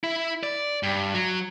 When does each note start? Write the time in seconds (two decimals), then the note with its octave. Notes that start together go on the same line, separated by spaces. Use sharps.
0.04 E4
0.43 D5
0.83 G2
1.14 F#3